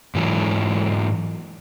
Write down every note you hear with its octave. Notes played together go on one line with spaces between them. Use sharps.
G#2 E3 F#3